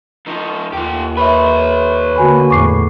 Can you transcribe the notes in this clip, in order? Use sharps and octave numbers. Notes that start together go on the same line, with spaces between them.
F3 D#4
D#2 F4 G4
B4 C#5 E5 B5
D3 A#3 F#4 G#5 B5
E2 A2 C#6 D6 C7